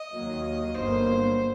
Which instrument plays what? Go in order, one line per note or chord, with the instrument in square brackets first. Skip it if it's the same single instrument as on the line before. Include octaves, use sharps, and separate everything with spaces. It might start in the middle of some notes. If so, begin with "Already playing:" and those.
Already playing: [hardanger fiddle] D#5
[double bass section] D#2 D#3 F#3 A#3
[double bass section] G1 G2 F#3 A#3 [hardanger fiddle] C5